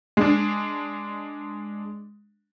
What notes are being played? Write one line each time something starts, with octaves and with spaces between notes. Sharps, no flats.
G#3 D4